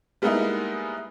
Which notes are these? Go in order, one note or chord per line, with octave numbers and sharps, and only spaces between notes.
G3 G#3 A#3 B3 D#4 E4